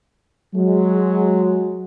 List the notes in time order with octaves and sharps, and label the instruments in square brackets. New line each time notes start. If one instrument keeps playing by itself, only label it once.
[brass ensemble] F#3 G#3